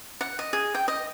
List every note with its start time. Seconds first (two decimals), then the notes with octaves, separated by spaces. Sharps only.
0.21 F#5
0.39 D#5
0.53 G#4
0.75 G5
0.88 D#5